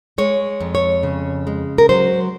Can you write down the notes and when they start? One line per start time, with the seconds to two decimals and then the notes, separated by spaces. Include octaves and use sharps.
0.18 G#3 C#5
0.60 F2
0.75 C#5
1.03 C#3
1.47 G#3
1.78 A#4
1.89 F#3 C5